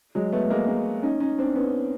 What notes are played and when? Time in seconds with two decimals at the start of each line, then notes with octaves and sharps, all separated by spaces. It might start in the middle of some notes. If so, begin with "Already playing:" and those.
0.15 F#3 G#3
0.32 A3 B3
0.50 G#3 A#3
0.67 G#3 A#3
1.03 C#4 D#4
1.20 C#4 D#4
1.38 C4 D4
1.55 B3 C#4